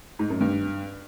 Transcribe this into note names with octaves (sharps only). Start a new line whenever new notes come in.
G#2
F#2
G2